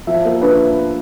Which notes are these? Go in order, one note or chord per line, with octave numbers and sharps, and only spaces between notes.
F3 E5
A#3
D4 B4